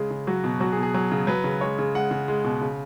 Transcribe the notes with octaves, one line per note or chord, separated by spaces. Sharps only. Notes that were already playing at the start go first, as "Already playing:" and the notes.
Already playing: C#3 G#3 G#4
C#3
F#3 F#4
B2
F#3 F#4
G#4
B2
G#4
F#3 G#4
C#3
F#3 B4
C#3
G#3 C#5
C#3
G#3 F#5
C#3
G#3
B2
C#3